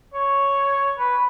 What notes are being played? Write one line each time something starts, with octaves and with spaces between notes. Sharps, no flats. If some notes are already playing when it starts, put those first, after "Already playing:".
C#5
B4